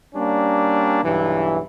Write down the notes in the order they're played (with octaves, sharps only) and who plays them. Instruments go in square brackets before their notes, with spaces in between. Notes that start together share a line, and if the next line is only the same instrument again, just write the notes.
[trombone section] G3 A#3 C#4 D4
B1 G2 E3